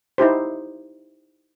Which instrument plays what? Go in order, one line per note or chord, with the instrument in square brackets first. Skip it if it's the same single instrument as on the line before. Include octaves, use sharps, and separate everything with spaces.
[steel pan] D#4 E4 G4 C5